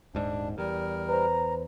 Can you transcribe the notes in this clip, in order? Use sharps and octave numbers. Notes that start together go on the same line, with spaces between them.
D#1 G#2 D4
E2 G3 A#4
B4 C5 A#5